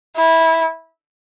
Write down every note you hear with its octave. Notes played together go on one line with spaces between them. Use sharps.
E4